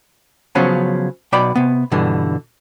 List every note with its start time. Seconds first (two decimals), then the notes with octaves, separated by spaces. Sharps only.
0.55 C#3 F3 F#3 B3 C#4
1.33 B1 B2 D5 G5 B5
1.55 C3 B3
1.92 G2 B2 D3 E3 G3